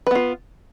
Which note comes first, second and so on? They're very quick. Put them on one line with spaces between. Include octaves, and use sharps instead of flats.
B4 B3 F4